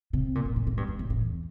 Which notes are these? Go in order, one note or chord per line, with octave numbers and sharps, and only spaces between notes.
C3
A#2
A2
A2
A2
G2
G#2
A2
A2
E2